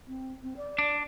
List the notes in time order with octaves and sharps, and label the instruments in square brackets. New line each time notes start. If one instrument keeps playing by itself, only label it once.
[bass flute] C4
C4
D5
[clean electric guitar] D4